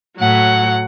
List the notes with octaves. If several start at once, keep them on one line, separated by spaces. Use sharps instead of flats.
A2 F#3 F#5